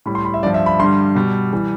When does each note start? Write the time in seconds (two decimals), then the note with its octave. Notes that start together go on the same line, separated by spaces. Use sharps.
0.06 A2 G3 B5
0.15 C6
0.25 B5
0.34 E5
0.43 G2 F3 D5
0.54 E5
0.66 B5
0.79 G2 D3 G3 C6
1.15 B2 G3
1.53 E3 G3